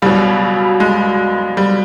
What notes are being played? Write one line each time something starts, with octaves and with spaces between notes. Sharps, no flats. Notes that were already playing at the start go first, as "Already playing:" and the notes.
C#2 B2 F#3 G3
G#3
G3